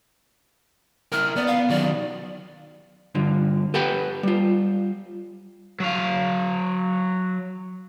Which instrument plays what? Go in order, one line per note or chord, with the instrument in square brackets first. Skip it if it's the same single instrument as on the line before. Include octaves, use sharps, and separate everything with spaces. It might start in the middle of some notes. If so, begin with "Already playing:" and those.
[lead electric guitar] E4 A#4 [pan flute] F6
[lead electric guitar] B3 [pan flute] D5
[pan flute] F5
[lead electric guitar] D#3 F#3 [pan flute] D5
[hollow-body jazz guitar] G2 D3 F3
G4 A4 B4 F#5 G5
G3 F4
[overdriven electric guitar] F#3 F5